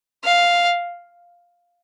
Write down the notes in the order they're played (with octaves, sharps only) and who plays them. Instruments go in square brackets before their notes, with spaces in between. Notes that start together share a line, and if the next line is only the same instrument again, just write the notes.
[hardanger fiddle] F5